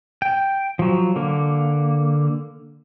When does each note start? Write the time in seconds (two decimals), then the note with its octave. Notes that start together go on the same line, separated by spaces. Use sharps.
0.22 G5
0.79 F3 F#3
1.16 D3 A#3